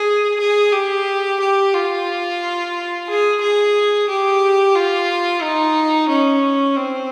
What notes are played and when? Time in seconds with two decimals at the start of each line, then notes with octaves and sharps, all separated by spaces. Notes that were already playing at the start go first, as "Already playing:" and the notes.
Already playing: G#4
0.40 G#4
0.73 G4
1.40 G4
1.74 F4
3.08 G#4
3.41 G#4
4.09 G4
4.75 F4
5.42 D#4
6.09 C#4
6.76 C4